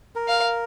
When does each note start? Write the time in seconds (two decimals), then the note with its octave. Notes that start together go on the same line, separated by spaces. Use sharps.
0.15 A#4
0.28 F5